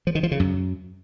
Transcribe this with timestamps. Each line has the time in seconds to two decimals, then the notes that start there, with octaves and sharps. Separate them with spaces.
0.07 F3
0.15 D#3
0.23 F3
0.31 C#3
0.40 F#2